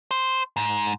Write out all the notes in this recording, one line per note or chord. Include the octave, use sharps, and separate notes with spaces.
C5
G#2